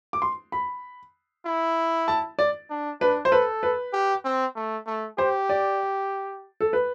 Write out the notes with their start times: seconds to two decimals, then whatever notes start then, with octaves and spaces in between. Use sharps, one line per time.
0.13 D6
0.22 C6
0.52 B5
1.46 E4
2.08 A5
2.39 D5
2.70 D4
3.01 D4 B4
3.25 C5
3.31 A4 B4
3.63 B4
3.93 G4
4.24 C4
4.56 A3
4.86 A3
5.18 G4 C5
5.49 D5
6.61 A4
6.73 B4